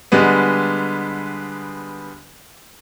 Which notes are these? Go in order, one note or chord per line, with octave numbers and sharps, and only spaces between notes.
D3 G3 G#3 B3